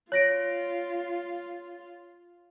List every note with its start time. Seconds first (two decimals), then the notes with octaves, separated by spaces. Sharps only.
0.12 F4 C#5 A#6 D7